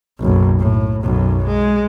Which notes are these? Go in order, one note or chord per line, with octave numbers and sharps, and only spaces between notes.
F#1 B1
A2
B1 F#2
G#3